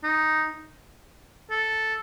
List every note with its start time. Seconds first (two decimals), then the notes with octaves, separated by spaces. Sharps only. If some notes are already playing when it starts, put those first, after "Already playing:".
0.03 D#4
1.50 A4